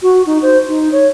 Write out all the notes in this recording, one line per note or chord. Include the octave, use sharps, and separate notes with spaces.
F#4
D#4
C5
D#4
C#5